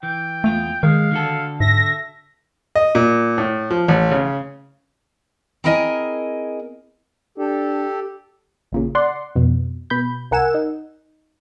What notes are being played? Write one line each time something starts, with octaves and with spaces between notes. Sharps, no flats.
E3 G5
E2 A3 F4
D#3 G#3 F5
D3 F#4 A4
G#2 E5 A#6
D#5
A#2
A2
F3
A1
C#3
C4 E4 G#4 A#4 D#5 G#5
D4 G4 A4
A1 A#2 C#3
D5 F#5 C6
F2 B2
B2 B5 G6
C2 A#4 F#5 G#5 E6 E7
D#4